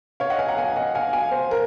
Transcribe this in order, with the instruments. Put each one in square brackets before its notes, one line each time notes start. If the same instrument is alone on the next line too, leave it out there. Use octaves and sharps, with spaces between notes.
[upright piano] C#5 F5
D#5 F#5
F5 G#5
F#5 A#5
F5 G#5
D#5 F#5
F5 G#5
F5 G#5
C5
A#4